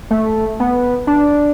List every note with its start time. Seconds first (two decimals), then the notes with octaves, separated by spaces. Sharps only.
0.11 A3
0.60 B3
1.07 D4